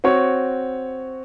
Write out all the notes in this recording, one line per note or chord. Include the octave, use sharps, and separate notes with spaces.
C4 F#4 C#5